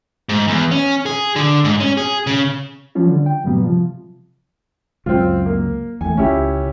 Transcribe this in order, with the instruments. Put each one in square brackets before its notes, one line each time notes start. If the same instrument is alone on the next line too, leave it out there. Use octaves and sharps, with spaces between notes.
[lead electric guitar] G#2
E2
C#4
G#4
D3
G#2
C#4
G#4
C#3
[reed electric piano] E3 F3 G3 C#4 F4
D3
G5
G2 A#2 C#3 F#3 G3 B3
C3 F3
[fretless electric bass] C#2 F#2 [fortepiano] C4 F4
[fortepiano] A#3
[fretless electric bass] E2 A3 [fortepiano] G#5
[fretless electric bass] C#2 [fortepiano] C#4 E4 G4